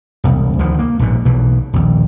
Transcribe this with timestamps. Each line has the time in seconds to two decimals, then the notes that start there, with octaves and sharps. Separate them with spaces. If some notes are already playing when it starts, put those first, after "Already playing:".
0.24 E1 C2
0.59 D2 D3 D#3 F3
0.79 A#3
0.99 A#1 G#2 B2
1.25 B1 B2 E3
1.73 A#1 D#2